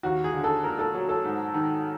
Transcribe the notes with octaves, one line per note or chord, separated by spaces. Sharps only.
D#2 F#4
G#4
D3
A4
A#2 A#4
A4
F#3
A4
G#2
D#3